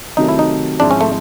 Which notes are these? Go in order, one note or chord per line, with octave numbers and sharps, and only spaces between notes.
C3 D#3 F#3 A3 D#4
E4
D#4
G#2 F3 G#3 C4 D4 E4
C#4
A3